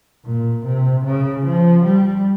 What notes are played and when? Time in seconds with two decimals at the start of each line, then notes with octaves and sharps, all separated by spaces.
0.25 A#2
0.66 C3
1.05 C#3
1.46 F3
1.85 G3